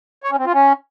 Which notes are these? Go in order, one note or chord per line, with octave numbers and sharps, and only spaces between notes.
C#5
C#4
C4
F4
C#4